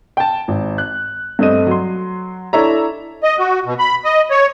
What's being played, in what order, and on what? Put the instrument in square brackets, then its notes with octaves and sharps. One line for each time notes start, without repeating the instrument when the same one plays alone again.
[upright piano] G5 A5
G#1
F#6
G2 A3 C4 D#5 D#7
F#3 C6
D4 E4 A4 C#5 E5 A#5
[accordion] D#5
F#4
B2
B5
D#5
C#5